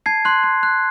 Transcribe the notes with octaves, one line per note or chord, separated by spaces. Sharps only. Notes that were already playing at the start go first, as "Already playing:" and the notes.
A5 G#6 C7
C6 F#6
C6
F#6